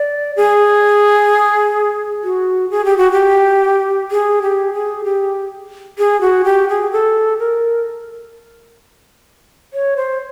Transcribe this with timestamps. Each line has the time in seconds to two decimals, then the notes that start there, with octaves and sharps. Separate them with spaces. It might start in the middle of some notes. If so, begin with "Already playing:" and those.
Already playing: D5
0.36 G#4
2.24 F#4
2.71 G#4
2.85 G4
2.98 F#4
3.12 G4
4.11 G#4
4.42 G4
4.74 G#4
5.04 G4
5.99 G#4
6.21 F#4
6.45 G4
6.69 G#4
6.92 A4
7.39 A#4
9.73 C#5
9.97 C5